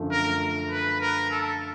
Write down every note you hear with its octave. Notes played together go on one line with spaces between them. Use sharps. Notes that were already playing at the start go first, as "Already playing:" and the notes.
Already playing: F#2 D3 F3 A3
A#4
B4
A#4
A4